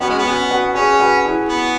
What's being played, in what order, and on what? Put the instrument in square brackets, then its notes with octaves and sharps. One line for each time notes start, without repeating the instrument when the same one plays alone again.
[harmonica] B3 [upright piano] C#4 F#4
[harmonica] G#3
B3
[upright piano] C#4 F#4
F#4 B4
[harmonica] C#4 [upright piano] G#4 C#5
[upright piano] F#4 B4
E4 G#4
[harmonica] B3